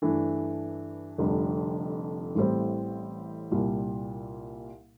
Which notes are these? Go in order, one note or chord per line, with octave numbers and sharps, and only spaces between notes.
G2 E3 A3 D4
F1 F2 D3 G3
A1 A2 G3 C4
C2 A#2 G3